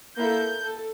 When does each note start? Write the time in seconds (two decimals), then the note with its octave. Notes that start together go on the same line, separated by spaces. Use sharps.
0.18 A#3 E4 A4 G6
0.63 A4